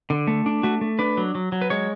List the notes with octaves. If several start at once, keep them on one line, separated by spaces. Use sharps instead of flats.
D3
A3
D4
A3 F#4
A3
D4 B4
F#3
F#3
F#3
B4
G#3 C#5